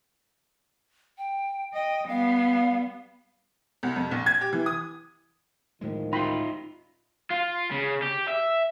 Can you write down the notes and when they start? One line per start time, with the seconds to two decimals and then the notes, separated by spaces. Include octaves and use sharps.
1.18 G5
1.74 D#5 G5
2.09 G3 B3 F5
3.83 C2
3.96 F2
4.11 A#1
4.26 G#6
4.41 G4
4.53 E3
4.66 D#6
5.81 D2 A2 D#3 F3 G#3
6.13 D#4 F4 G5 B5 C6
7.30 F4
7.71 C#3
8.02 G4
8.28 E5